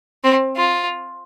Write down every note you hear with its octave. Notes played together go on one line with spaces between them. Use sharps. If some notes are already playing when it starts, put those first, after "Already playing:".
C4
F4